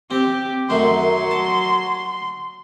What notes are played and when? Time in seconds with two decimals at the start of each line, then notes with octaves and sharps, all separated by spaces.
0.11 C4 G4
0.70 F#2 D#3 F#3 A3 C6
1.31 A5